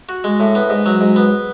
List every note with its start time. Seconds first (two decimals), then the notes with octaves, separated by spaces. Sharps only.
0.09 F#4
0.24 G#3
0.40 A2
0.55 B3
0.70 G#2
0.86 F#3
1.01 G#2
1.16 B3